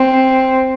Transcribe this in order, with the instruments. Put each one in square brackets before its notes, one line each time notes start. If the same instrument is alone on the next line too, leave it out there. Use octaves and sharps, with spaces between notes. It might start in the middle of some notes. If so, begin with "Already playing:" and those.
Already playing: [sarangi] C4